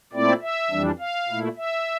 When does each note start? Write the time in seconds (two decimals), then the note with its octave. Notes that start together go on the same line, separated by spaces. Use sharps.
0.13 A#2 A3 C4 E4 D5
0.42 E5
0.70 F2 E3 G3 D4
0.99 F5
1.28 A#2 A3 E4
1.57 E5